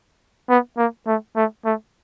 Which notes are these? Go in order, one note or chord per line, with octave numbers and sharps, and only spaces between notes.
B3
A#3
A3
A3
A3